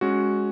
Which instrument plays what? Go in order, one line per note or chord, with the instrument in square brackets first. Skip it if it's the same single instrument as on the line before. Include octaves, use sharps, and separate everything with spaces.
[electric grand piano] G#3 C#4 F#4